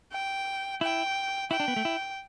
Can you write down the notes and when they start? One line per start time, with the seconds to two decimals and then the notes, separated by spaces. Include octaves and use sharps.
0.12 G5
0.81 E4 G5
1.51 E4 G5
1.60 D4
1.68 B3
1.76 A3
1.85 E4